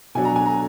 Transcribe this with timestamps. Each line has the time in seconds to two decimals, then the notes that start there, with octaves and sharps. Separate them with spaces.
0.15 B2 F#3 D4 G#5
0.25 A#5
0.36 G#5
0.46 A#5